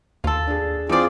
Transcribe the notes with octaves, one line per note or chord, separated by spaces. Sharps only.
D#2 F4 A4
D4 G#4
E3 G3 C4 F4 G#4 D5 D#6 D7